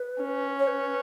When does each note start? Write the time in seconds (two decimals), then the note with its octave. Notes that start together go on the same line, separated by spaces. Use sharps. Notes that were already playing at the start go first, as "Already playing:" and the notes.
Already playing: B4
0.22 C#4
0.59 C#5
0.68 B4